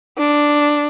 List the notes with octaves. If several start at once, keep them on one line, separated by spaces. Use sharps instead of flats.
D4